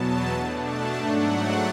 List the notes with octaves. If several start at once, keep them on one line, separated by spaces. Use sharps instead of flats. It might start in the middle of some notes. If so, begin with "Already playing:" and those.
Already playing: E2 B2 F#3 B3 A5
B2 A3 D4
A5
G#2 F#3 A3 D4 F#5